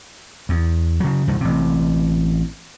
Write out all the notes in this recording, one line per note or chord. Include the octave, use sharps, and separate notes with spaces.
E2
C#3 F#3
C2 G2 D#3
A1 C3